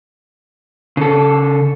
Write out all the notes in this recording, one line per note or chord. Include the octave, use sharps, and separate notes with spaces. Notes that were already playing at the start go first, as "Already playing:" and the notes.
C#3 A4